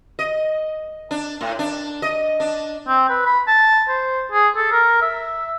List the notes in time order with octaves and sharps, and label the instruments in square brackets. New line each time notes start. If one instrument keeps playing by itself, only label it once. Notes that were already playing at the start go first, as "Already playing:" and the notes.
[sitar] D#5
D4
A2
D4
D#5
D4
[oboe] C4
B4
B5
A5
C5
G#4
A4
A#4
E5